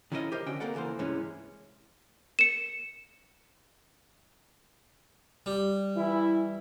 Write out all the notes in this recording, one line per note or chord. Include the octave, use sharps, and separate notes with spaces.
D#3 F3 C#4 E4 F#4 D#5
G4 A#4 C5 D#5
D3 C#4 F#4 D#5 G5
A#3 C4 A4 A#4 D5 F#5
C#2 E3 G#3 A#3 C5
G2 C3 E3 G#3 C#4 E4
C#7 E7
G3
E3 E4